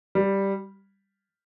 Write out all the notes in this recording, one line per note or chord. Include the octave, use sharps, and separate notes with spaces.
G3